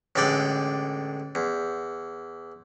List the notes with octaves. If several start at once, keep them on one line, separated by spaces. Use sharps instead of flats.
A1 D3 G#3 D5 G5 B5
E2